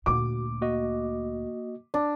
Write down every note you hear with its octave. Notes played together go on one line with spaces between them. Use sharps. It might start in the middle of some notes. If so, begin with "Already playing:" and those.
D2 A#2 F#4 D6
A#3 F#4 D#5
D4